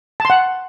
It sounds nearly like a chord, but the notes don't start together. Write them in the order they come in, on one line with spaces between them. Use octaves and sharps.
A5 C6 F#5